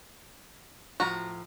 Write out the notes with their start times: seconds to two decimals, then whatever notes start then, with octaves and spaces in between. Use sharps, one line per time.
1.00 A2 F3 F#4 A#5